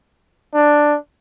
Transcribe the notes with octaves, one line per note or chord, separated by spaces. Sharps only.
D4